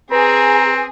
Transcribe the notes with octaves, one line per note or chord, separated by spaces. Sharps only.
C4 G#4 B4 A#5